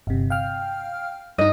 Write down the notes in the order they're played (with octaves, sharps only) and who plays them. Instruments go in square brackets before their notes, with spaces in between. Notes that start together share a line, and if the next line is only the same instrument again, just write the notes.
[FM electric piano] G1 C3
F5 G5 F6
[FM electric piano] G2 D#4 [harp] D#5